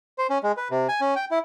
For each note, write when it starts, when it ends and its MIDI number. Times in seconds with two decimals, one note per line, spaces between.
0.18 0.27 72
0.30 0.38 61
0.43 0.52 56
0.57 0.68 71
0.71 0.87 48
0.89 1.00 80
1.01 1.14 61
1.16 1.25 79
1.31 1.39 64